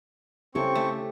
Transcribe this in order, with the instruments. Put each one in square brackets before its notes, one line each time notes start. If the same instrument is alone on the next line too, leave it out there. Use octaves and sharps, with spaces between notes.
[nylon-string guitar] C#3 E4 A4 [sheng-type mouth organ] C4 C#6 [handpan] G4 C#5
[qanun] A3